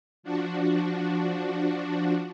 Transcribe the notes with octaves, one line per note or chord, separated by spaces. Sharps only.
F3 D4 F#4